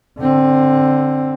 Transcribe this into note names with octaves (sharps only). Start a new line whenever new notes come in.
D3 C4